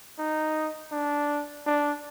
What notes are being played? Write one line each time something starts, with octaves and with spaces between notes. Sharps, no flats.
D#4
D4
D4